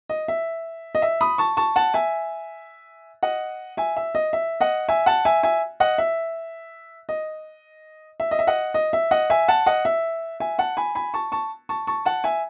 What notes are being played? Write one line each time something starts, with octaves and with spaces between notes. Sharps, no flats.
D#5
E5
D#5
E5
B5 D#6
A5 C#6
A5 C#6
F#5 A5
E5 G#5
D#5 F#5
E5 G#5
E5
D#5
E5
D#5 F#5
E5 G#5
F#5 A5
E5 G#5
E5 G#5
D#5 F#5
E5
D#5
E5
D#5
E5
D#5 F#5
D#5
E5
D#5 F#5
E5 G#5
F#5 A5
D#5 F#5
E5
E5 G#5
F#5 A5
G#5 B5
G#5 B5
A5 C#6
A5 C#6
A5 C#6
A5 C#6
F#5 A5
E5 G#5